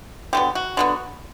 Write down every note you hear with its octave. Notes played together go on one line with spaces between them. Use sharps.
D3 F#3 B3 G4
F#4
D3 F#3 B3